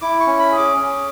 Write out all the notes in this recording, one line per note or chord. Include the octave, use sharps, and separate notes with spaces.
E4 D6
C#6
C#4
B5
G#4
D6
C#4